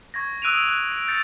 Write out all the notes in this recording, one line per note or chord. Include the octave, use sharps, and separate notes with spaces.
C#6 G#6 A#6
D#6 E6 F#6 D7 D#7 F7
F#6
D7
G6 A6 C#7